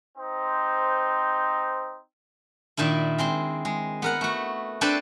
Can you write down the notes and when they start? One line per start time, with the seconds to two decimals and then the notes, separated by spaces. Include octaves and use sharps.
0.17 C4 D#4 C5
2.77 A#2 D#3 D4 E4
3.18 G#3 C4 C6
3.65 G#3
4.02 B3 A#4 F#5
4.21 A3 F#4
4.81 C4 D4 A4 B4 C5 D5